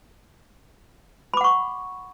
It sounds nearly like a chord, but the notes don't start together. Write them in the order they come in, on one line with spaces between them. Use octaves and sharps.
B5 D6 F#5 C#6